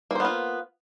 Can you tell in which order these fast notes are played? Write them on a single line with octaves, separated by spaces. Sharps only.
A#3 C5 B3 F4